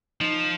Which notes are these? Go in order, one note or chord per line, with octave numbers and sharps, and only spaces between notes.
F3 D#4